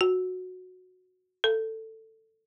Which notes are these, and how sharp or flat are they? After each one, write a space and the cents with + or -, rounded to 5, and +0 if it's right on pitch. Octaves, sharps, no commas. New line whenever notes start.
F#4 -10
A4 +15